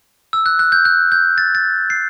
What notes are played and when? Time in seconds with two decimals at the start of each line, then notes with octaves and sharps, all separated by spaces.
0.33 E6
0.46 F#6
0.59 F#6
0.72 G6
0.85 F#6
1.12 G6
1.38 A6
1.55 A6
1.90 C7